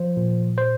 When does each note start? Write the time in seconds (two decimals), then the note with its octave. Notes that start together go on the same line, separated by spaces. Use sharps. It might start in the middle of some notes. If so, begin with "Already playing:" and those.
Already playing: F3 C5
0.17 A#2
0.58 C5